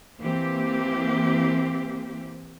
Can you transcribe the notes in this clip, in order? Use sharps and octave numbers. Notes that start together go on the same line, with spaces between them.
E3 A#3 C4 G4